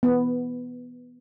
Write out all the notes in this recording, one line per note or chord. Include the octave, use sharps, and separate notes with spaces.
B3